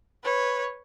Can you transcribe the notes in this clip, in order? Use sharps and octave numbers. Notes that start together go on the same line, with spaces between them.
B4 C#5